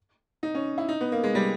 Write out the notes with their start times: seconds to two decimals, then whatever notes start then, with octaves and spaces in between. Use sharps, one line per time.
0.43 D#4
0.54 C#4
0.78 E4
0.89 D#4
1.01 B3
1.12 A#3
1.24 G#3
1.35 G3